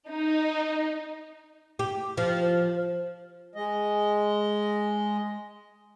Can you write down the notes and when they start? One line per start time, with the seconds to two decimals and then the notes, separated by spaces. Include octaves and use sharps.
0.10 D#4
1.79 G4
2.17 F3
3.55 G#3 D#5